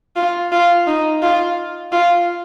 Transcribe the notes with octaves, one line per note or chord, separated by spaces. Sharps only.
F4
F4
D#4
F4
F4